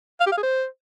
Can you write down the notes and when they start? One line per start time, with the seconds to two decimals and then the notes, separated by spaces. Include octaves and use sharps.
0.20 F5
0.26 G4
0.32 F5
0.37 G#4
0.43 C5